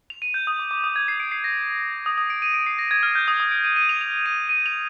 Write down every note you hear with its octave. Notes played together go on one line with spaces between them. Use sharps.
F7
D#7
G6
D#6
D6
D6
D#6
G#6
C7
D7
C7
A#6
D#6
D#6
D7
D#7
D7
C7
A#6
G#6
F6
G6
D#6
D#6
D7
D#7
D#7
F7
F7
D#7
D#7
F7